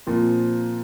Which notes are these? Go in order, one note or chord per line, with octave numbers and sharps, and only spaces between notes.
A#2 F3 C4